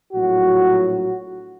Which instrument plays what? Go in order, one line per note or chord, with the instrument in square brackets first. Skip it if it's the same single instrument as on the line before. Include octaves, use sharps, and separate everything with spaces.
[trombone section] A#1 A2 F#3 F#4